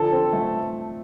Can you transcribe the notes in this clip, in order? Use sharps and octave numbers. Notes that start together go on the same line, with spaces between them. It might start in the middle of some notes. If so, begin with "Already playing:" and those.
Already playing: D3 F3 A4
C4
A3